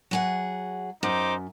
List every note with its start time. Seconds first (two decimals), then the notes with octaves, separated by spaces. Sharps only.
0.11 F#3 G#4 F#5
1.03 F#2 D#4 C5 D6